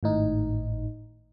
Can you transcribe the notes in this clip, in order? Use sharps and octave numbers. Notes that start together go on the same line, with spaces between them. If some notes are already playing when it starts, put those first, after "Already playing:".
G#1 A2 D#4